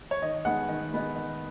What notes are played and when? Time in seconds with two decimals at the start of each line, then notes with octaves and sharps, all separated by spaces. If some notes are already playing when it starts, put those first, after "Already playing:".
0.11 C#5
0.22 D#3 D#5
0.45 G#3 B3 D#4 F#5
0.68 D#3
0.92 G#3 B3 D#4
1.15 D#3